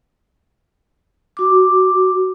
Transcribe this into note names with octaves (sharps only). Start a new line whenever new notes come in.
F#4 D6